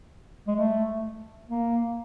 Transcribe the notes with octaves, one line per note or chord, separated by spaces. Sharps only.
G#3
A3
A#3